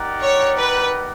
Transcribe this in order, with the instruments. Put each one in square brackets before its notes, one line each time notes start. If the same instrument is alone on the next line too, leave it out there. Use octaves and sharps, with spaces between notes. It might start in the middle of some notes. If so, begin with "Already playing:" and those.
Already playing: [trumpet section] D#4 G4 A#4 D5 F#5
[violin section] C#5
B4